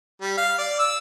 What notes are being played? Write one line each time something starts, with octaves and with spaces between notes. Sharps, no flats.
G3
F5
D5
E6